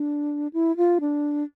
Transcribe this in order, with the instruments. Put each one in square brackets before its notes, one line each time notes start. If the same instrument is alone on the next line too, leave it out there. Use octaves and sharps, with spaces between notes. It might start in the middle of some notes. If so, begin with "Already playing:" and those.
Already playing: [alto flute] D4
E4
F4
D4